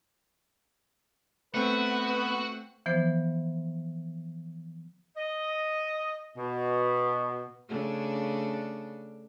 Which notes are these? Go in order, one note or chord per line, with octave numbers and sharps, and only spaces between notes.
A3 B3 C4 F#4 B4
E3 F3 B3 C5
D#5
B2
C#3 A3 D4